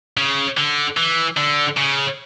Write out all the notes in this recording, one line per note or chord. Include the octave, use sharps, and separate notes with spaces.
C#3
D3
E3
D3
C#3